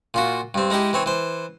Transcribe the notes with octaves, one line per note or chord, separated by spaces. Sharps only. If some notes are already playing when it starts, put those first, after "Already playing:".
A#2 F4 F#4
G2 C4
G#3 D#4 E4 G4
E3 C4 C#5
E3 C5